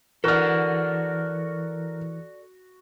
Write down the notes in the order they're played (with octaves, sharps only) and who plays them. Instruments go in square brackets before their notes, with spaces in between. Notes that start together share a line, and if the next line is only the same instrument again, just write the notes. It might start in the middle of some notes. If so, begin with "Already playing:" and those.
[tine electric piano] E3 [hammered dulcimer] F#4 [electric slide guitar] A4 D5 [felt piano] A#4 F6